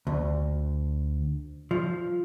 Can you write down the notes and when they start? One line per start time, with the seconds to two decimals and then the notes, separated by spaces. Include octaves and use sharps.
0.07 D2
1.71 F3